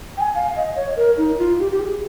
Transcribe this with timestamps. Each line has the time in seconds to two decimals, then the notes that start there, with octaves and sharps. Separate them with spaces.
0.17 G5
0.21 G#5
0.35 F5
0.56 D#5
0.76 C#5
0.97 A#4
1.17 D#4
1.39 F4
1.60 G4
1.72 G4
1.80 G#4